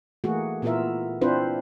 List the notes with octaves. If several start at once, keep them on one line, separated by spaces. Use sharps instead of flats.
E3 A3 A#3 F#4 G#4
A#2 B3 E4 F4 A#4 E5
C4 D4 E4 F4 B4 C5